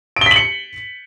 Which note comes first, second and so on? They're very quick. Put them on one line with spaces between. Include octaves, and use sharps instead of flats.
D7 G7 B6 F#7 C#7